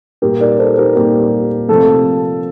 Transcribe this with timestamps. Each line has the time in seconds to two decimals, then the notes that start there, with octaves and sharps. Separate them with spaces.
0.22 A#2 G3 A#3 G4 A#4
0.41 A#4 D5
0.59 A4 C5
0.78 G4 A#4
0.96 A#2 G3 A#3 G4
1.68 C3 F3 A3 A4